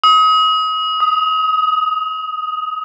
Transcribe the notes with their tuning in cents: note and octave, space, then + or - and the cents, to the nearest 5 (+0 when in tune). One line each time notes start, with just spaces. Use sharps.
D#6 +35
D#6 +5